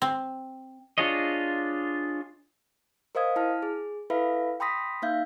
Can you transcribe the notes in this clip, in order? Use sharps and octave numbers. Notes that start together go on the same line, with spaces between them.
C4
D4 F4 G#4 C#5 D#5
A#4 C5 D#5 F5 D#6 G#6
E4 A5 F6
G#4
E4 A4 B4 E5 F5 B5
G5 B5 C6 D#6 A#6 B6
A#3 D#4 E5 F5 G6